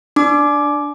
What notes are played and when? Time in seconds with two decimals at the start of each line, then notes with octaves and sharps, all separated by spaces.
0.16 D4 D6